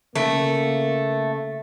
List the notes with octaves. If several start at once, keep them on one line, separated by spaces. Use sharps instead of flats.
C#3 A3 A#3